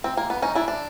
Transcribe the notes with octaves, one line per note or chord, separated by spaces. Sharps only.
C4
A#3
B3
C#4 D#4
D4 E4
D4